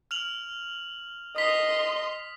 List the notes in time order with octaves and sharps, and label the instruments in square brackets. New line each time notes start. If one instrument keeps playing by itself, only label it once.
[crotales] F6 F7 F#7
[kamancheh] D#5 C6 [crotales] D#6 B6